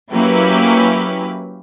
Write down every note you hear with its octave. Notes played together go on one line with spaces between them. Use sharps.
F#3 A#3 C#4 E4 G4 B4